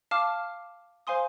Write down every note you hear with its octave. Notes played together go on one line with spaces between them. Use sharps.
F5 A5 D6 F6
C5 F5 G#5 C6 D#6